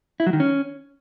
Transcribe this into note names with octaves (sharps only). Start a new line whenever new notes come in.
E4
F#3
D#3
C#4